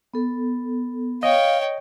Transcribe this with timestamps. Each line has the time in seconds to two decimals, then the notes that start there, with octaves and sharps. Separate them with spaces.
0.14 B3 A4
1.23 C#5 D#5 F5 G5